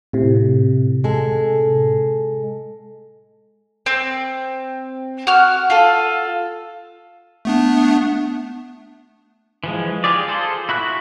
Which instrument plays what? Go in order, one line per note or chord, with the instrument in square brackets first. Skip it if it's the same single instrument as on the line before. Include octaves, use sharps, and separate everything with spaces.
[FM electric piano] A2 C3
[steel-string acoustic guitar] G#3 A4
[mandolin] C4
F#4 F6
F4 A4
[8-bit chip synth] A3 B3 D4
[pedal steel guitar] E3 F3 G#3
F4 G4 G#4 D5
F4 G#4 A4 C5
E4 F#4 B5 F#6